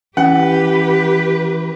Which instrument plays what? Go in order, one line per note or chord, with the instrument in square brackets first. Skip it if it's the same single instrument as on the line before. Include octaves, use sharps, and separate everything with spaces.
[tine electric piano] E3 [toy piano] C#4 [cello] G4 B4 [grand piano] F#5